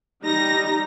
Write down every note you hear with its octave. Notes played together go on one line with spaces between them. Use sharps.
G3 D#4 A#5 A#6